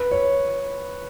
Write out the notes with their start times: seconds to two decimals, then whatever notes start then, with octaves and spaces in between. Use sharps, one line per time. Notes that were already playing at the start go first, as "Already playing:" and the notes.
Already playing: B4
0.11 C#5